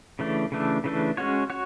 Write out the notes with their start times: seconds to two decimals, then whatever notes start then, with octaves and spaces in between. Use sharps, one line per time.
0.19 C#3 E3 A3 D4
0.52 C#3 E3 A3 D4
0.84 C#3 E3 A3 D4
1.17 G#3 C#4 F#4 C#5
1.50 F#4 C#5